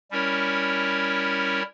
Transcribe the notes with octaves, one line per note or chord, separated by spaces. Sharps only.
G3 C#4 E4 A#4 C#5